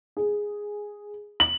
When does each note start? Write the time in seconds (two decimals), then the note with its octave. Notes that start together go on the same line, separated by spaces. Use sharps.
0.17 G#4
1.40 F#7